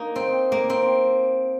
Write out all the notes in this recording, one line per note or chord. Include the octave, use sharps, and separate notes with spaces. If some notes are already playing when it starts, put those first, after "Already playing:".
Already playing: A#3 D#4
C4
A#3
C4